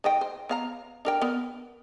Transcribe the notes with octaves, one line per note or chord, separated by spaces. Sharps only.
D#3 D#5 G5
C5
B3 F5 A#5
D4 A#4 G5
B3 A#4